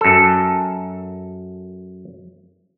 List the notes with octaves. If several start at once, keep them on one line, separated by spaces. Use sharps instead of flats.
F#2 A4